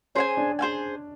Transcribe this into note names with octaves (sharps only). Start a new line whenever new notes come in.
C#4 G#4 C5 F5 G#5
D4
G#4 C5 F5 G#5